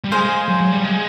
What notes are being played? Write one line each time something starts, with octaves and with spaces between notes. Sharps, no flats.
G3
G#3 G#4 C5 F5
F#3
F#3
G3
G#3